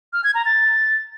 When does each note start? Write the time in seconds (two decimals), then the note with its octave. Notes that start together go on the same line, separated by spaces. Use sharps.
0.13 F6
0.24 G#6
0.35 A#5
0.45 A6